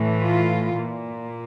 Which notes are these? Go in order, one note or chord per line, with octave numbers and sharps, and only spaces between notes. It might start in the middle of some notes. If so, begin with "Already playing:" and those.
Already playing: A2 E3
F4
A#2